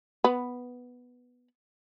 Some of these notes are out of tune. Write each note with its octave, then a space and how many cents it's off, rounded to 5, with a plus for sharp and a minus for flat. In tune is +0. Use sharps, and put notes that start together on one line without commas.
B3 +0 B4 +0